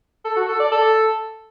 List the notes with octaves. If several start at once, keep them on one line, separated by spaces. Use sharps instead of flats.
A4
F#4
A4
D5
A4